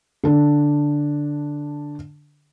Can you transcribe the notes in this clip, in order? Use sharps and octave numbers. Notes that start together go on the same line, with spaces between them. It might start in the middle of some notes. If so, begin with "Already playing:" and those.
D3 D4